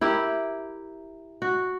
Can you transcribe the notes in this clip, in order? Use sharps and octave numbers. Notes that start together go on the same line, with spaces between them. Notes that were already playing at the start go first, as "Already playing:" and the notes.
E4 G4 A#4
F#4